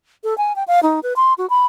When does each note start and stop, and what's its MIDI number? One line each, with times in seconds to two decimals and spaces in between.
0.24 0.37 69
0.38 0.55 80
0.56 0.64 79
0.68 0.80 77
0.83 1.00 63
1.03 1.13 71
1.16 1.34 84
1.38 1.49 66
1.50 1.66 83